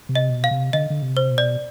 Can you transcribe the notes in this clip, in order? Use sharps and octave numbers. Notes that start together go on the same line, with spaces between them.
C3
D#5
B2
F5
C3
D3 D#5
D3
C3
C5
B2
D5